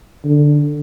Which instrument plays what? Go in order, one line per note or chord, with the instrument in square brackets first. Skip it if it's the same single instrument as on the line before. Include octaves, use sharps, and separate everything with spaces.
[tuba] D3